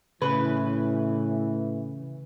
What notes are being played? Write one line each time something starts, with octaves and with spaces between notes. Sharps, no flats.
A2 C#3 E3 B4